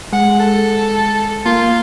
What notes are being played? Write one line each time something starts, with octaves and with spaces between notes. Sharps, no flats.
G#3 F#5
A4
A#3 F4